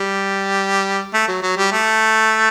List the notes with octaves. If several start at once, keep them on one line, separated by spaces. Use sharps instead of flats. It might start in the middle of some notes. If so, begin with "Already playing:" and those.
Already playing: G3
A3
F#3
F#3
G3
A3